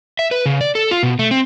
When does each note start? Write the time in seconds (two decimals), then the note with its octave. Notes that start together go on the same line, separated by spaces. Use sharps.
0.19 E5
0.31 B4
0.46 C#3
0.61 D5
0.75 A4
0.91 F4
1.03 B2
1.19 A3
1.31 C4